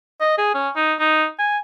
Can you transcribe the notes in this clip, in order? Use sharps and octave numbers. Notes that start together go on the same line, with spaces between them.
D#5
G#4
C#4
D#4
D#4
G#5